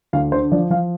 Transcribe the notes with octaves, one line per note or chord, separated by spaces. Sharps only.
D2 F5
D3 C5
F3 D5
F3 F5